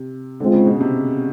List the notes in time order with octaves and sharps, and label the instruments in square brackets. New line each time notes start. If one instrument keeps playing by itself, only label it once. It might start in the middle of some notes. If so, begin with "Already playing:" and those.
Already playing: [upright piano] C3
[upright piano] D3 [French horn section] G#3 C4 F4
[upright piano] C#3
B2
C3